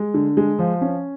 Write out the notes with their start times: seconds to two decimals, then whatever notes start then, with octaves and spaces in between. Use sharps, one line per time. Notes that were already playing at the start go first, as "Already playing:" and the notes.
Already playing: G#3
0.14 D3
0.37 G#3
0.59 F3
0.81 C#4